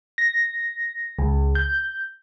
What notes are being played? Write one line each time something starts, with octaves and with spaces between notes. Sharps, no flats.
A#6
C#2
G6